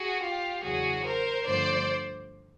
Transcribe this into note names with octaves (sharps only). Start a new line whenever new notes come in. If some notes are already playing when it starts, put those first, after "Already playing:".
Already playing: F#4 G#4
F4 G4
E2 C#3 F#3 F#4 G#4
A#4 C5
G2 D3 F3 A3 C5 D5